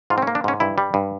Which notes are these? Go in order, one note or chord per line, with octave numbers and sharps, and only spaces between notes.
G#2 F4
C4
C#4
A#3
D4
G#2 C#4
G2 E4
G3
G2